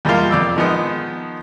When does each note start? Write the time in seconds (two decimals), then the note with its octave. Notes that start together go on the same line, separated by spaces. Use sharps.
0.05 E2 G3 G#3 A#3 F4
0.31 F2 D5 E6
0.57 D#3 F3 G#3 B3 D#4